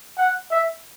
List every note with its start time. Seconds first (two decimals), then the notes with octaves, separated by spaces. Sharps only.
0.17 F#5
0.51 E5